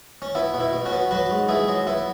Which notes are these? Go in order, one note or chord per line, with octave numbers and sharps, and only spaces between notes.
C#4
B3 E4
B2
E4
B2
C#4 F#4
B3
F#3 F#4 B4
G#2
B3 E4 G#4
F#3
B3 E4